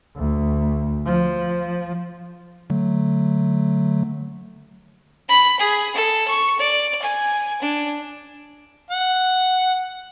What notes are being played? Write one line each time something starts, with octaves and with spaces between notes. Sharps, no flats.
D2
F3
D3 F#3 A3
B5
G#4
A4
C#6
D5
G#5
D4
F#5